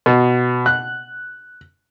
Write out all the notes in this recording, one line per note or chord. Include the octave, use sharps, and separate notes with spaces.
B2
F#6